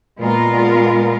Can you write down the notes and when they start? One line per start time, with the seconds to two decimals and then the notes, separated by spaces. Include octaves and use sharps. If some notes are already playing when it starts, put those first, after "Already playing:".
0.19 A#2 G#3 B3 F4 A#4
0.49 A#2